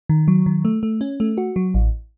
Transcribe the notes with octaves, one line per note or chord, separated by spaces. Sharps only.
D#3
F#3
D#3
A3
A3
C#4
A3
F#4
F#3
A1